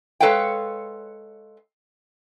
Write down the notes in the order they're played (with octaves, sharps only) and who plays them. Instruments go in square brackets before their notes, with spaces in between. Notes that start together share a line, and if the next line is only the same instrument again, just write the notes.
[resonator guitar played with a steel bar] G#3 A4 B4 C#5 F5 G5